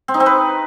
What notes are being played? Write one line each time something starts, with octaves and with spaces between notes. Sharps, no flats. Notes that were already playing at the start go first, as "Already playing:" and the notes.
C4
D#4
C4
B4